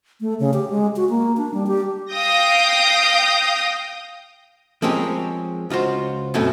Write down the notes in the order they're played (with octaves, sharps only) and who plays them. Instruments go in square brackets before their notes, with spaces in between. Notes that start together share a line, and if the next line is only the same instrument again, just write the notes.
[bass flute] A3
C#3
G4
G#3
F#4
A#3
D4
G3
G4
[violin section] F5 G5 D#6 G6 A#6
[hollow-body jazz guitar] F3 G#3 C4 C#4 G4 A#4
C#2 F4 F#4 C5
F#2 B2 A3 C4 C#4